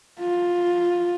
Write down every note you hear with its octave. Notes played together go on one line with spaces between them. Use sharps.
F4